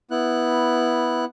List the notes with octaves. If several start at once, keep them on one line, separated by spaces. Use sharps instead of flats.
B3 E4 F#6